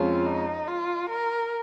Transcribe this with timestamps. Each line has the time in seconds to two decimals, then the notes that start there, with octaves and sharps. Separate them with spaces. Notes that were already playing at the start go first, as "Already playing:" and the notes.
Already playing: F2 F3 G#3 C#4 F4
0.26 D#4
0.67 F4
1.09 A#4